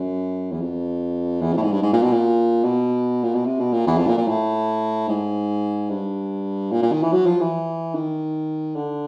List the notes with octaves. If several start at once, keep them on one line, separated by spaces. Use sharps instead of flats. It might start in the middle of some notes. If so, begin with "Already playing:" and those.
Already playing: F#2
E2
F2
E2
F2
A2
G#2
G2
G#2
A#2
B2
A#2
B2
A#2
B2
C3
B2
A#2
E2
F2
A#2
A#2
A2
G#2
G2
A#2
A#2
D#3
E3
F#3
F3
E3
D#3
D3